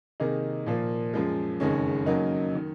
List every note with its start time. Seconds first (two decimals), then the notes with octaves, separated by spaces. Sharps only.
0.20 C3 D#3 A#3 D#4 G#4
0.66 A#2 F3 A#3
1.14 F#2 F3 G#3
1.60 F#1 F2 D#3 G#3 C#4
2.06 F#2 C#3 F#3 A#3 D#4
2.55 D#3